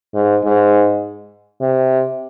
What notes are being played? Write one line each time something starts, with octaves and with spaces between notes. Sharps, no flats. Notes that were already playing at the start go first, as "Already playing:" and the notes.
G#2
G#2
C3